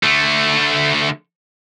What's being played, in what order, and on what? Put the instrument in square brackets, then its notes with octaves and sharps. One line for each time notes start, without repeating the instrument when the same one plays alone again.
[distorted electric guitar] D3 A3